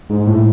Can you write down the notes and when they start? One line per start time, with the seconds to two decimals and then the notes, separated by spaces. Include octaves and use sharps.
0.10 G#2
0.27 A2